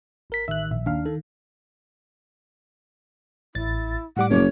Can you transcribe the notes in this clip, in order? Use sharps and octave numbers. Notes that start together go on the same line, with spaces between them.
G#1 A#4 B6
A1 A2 D#3 E5 F#6
A#1 E5
D#2 D4 F5
D#3 A4
A1 E4 A6
A2 G3 F#5 D6
F#1 C#5